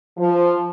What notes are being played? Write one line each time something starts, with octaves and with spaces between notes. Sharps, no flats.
F3